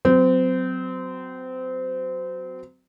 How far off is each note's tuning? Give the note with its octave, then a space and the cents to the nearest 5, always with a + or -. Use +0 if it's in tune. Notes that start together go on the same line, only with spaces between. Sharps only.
F#3 +0 C4 -25